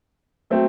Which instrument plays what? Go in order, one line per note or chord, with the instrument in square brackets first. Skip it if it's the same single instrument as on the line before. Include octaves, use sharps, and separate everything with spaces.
[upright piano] F#3 A3 C4